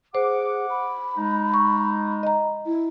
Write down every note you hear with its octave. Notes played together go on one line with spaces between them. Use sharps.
G#4 C5 F#5 D6
B5
G#3 D#4
C#6
D#5 A#5
E4